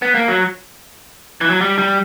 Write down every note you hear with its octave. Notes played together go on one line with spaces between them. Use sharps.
B3
A#3
F#3
E3
F#3
G3
G3